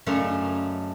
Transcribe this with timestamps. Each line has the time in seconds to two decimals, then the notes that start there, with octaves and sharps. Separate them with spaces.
0.07 F#2 C#3 A3 D4 D#4 C6